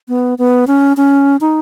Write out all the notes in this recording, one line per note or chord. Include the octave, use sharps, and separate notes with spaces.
B3
B3
C#4
C#4
D#4